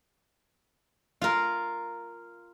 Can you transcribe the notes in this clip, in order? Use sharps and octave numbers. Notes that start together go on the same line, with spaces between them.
F4 A#4